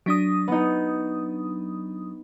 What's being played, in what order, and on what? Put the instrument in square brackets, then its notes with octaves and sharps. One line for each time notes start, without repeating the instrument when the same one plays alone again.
[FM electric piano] F#3 D4 D#6 [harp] A#6 B6 D7
[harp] B3 D#4